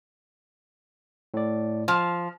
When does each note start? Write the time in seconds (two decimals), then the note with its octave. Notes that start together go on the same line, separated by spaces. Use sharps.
1.34 A2 D5
1.88 F3 F6